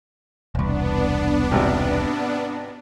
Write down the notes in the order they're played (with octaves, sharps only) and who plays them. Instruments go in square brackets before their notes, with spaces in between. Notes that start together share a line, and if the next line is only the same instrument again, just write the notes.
[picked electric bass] E1 C2 [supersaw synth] B3 D4
[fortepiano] G#1 C3 G4